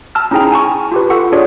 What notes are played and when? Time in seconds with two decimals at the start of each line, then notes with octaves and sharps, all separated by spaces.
0.15 A5 E6 F6
0.31 C#4 D#4 E4 G#4 G5 A#5
0.52 G#5 A5 C#6
0.92 F4 G4 B4
1.10 F4 A4 F#5 C#6
1.32 D4 F4 G#4 C#5 D5